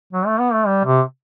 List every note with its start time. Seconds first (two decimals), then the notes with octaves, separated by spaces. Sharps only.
0.13 F#3
0.26 A3
0.40 B3
0.53 A3
0.67 G3
0.85 C3